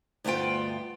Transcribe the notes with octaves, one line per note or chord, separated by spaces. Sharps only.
D2 G2 B3 F4 G5